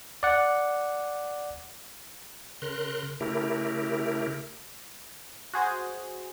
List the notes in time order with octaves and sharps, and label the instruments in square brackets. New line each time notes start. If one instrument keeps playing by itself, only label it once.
[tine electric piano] D5 F#5
[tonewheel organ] C#3 A#4 C6 F#6
C#3 A3 E4 G4 A#4
[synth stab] F#4 G#4 C5